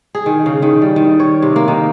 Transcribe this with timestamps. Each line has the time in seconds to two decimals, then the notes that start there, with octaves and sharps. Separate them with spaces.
0.15 G#4
0.26 D#3
0.46 C#3
0.62 D#3
0.82 G3
0.96 D#3
1.20 C#5
1.42 C3
1.56 A#3
1.68 D#3